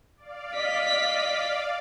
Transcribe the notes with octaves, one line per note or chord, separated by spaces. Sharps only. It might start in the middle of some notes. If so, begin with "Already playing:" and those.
D5 F5
D#5 B6